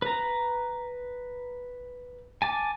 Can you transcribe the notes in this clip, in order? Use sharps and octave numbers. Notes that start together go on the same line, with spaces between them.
B4 A#5
G#5 A5 D6